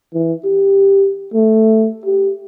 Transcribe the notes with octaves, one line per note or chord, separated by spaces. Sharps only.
E3
G4
A3
G4